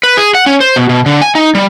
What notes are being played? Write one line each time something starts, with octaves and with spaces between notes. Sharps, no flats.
B4
G#4
F#5
C#4
C5
B2
B2
D3
G#5
D#4
G3